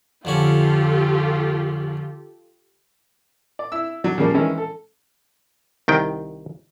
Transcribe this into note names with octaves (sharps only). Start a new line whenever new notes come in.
F2 D3 C#4 F4 G4 A4
D5
E4 E6
F#3 D4
C#3 F3 G3 A#3 D4
D#3 E3 G#3 C#4
A4
C2 D#3 G5